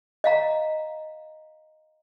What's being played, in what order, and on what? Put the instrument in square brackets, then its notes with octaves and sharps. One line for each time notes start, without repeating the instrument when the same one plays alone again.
[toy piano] D#5 F5 A#5